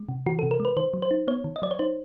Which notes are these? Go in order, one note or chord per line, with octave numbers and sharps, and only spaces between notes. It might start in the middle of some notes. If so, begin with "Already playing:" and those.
Already playing: G#3
C3
E3 F#4
A4
C3
A#4
G#3
B4
D#3 C5
F#3
C5
D#4
B3 C#5
D#3
D#5
F#3 D5
C#5
D#4 C5